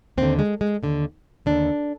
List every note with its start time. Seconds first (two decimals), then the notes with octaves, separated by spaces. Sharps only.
0.17 D#2 D3 C4
0.39 G#3
0.61 G#3
0.83 D#2 D3
1.46 D#2 D3 D4